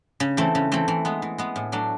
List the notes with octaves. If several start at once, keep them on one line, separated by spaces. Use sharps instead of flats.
C#3
E3 A3 C4
C#3
E3 A3 C4
E3
G#3 B3
E3
G#3 B3
A2
F#3 A3 D4